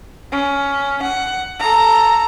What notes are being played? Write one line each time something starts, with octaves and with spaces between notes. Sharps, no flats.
C#4
F#5
A4 A#5